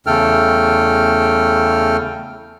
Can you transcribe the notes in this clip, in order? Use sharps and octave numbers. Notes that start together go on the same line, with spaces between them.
E2 C#3 A3 A4 G5 F6